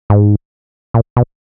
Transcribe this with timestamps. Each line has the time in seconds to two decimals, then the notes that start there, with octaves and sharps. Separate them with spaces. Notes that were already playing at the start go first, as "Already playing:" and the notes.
0.10 G#2
0.94 A#2
1.16 B2